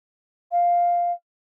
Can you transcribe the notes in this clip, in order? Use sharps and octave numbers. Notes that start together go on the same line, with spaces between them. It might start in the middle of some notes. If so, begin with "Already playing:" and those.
F5